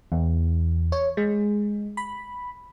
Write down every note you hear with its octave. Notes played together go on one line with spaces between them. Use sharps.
E2
C#5
G#3
B5